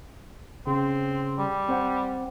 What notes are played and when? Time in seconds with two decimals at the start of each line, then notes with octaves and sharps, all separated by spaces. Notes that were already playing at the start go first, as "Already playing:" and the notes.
0.67 C#3 C4
1.38 G3
1.69 C4 C5 F#5